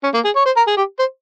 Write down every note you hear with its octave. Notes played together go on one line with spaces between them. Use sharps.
C#4
A#3
G#4
C#5
C5
A#4
G#4
G4
C5